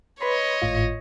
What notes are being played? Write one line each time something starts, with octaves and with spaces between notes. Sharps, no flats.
B4 C#5 D#5 B5 C6
G#1 A2 F4